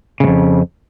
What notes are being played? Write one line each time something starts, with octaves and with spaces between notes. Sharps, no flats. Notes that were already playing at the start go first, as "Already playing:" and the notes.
F2 G#2 C#3